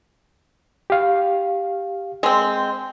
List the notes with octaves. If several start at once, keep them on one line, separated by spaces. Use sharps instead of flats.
G4 F5
G#3 C4